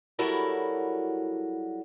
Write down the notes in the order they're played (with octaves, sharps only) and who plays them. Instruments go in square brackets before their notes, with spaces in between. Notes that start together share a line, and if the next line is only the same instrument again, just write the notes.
[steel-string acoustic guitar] F#3 G3 E4 F#4 A4 A#4